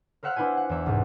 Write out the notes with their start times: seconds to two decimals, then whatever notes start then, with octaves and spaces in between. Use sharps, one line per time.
0.23 A#4 C5 E5 F#5 F6 F#6
0.36 D4 E4 B4 C5 G#5
0.57 F#5
0.69 E2 E5
0.86 C2 G#2